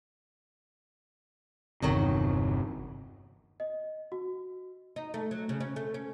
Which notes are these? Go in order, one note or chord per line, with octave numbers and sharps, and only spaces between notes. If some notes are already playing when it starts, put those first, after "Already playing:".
G1 E2 C3 D#3 F#3 D#4
D#5
F#4
D#4
A3
F#3
C#3
C#4
A3
C#4